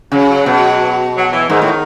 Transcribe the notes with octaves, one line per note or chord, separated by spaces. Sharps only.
C#3 F#3
F#3
B2
F#3
E3
G#2 D#3
A2